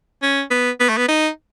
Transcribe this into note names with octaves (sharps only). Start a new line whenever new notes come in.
C#4
B3
B3
A3
B3
D#4